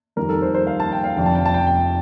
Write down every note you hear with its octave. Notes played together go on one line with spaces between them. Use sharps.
F2 D#3 G3 A#4
A4
C5
C5
F5
A5
G5
F5
F1 F2 D3 G5
A5
G5
A5
G5
G5